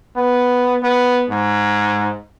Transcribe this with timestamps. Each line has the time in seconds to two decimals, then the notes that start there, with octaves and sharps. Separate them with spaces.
0.16 B3
0.83 B3
1.29 G#2